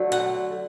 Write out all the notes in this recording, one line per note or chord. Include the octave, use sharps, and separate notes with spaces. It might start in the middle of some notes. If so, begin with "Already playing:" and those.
Already playing: D3 F#3 A3
F#5